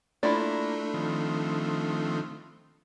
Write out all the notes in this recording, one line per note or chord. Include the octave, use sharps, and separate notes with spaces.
A3 A#3 D4 E4 F4 A4 D5
D#3 F3 C4